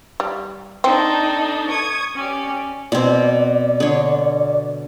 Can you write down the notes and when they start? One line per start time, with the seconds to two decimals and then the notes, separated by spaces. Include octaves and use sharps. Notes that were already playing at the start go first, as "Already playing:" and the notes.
0.20 G3
0.84 C4 D4 D#4 A4
1.68 C#6 D#6 G#6
2.14 C#4 G4 D5
2.92 B2 C4 D5
3.80 D3 C#5